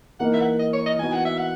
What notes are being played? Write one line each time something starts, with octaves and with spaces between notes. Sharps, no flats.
E3 A#3 D#4 A#4 F#5
E5
F#5
D#5
C#5
D#5
E3 B3 D#4 F#4 G#5
F#5
E5
F#5